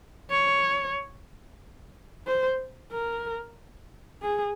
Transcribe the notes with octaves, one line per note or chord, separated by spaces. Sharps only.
C#5
C5
A#4
G#4